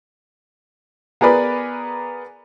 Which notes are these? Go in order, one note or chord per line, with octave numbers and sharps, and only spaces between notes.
B3 G#4 A#4 B4 D5 B5